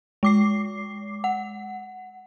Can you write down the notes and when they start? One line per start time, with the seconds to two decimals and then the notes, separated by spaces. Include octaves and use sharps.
0.23 G#3 D6 C7
1.24 F#5